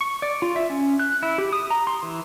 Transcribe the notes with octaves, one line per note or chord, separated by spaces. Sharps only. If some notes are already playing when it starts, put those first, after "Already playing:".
C#6
D5
F4
E5
C#4
F#6
E4
G4
D#6
A#5
C6
E3